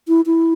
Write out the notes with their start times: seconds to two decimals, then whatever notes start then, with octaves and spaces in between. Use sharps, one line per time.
0.08 E4
0.26 E4